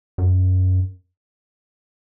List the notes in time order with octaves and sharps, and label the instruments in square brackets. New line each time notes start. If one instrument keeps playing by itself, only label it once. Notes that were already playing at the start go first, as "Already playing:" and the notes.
[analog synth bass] F#2